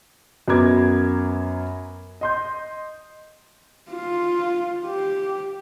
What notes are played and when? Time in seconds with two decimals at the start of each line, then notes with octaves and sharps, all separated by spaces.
0.48 F#2 F#3 B3 A#5 D6 G#6
2.21 D#5 C6 G6
3.90 F4
4.86 G4